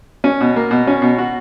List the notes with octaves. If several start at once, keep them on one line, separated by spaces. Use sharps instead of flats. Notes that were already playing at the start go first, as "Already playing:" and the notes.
C#4
B2
A#3
B2
C#4
B2
F#4